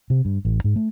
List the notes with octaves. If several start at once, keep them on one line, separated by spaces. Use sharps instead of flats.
C3
G2
A1
G#2
A3